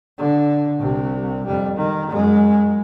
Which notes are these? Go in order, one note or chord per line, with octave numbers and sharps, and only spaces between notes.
D3
C2 C3
F2 G3
D#3
F#2 G#3